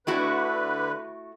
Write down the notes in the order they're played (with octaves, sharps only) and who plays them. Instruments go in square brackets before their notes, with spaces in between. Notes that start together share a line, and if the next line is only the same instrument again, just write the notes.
[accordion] D3 B4 [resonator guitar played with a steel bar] A3 E4 F#4